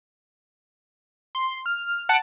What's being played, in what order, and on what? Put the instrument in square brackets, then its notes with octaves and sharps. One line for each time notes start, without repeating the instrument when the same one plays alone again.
[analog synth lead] C6
F6
[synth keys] F#5 D7 [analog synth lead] A5